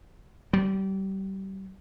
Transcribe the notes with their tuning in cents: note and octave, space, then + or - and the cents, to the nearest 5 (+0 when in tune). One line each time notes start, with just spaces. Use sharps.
G3 -30